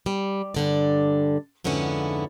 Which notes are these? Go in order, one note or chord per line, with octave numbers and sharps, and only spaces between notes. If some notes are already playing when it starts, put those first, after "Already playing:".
G3
G2 D3 D5
F2 G#2 D3 B3 C#4 E4